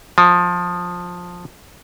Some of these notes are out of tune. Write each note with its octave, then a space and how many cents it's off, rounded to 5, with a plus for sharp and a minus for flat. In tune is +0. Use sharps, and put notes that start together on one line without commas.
F3 +15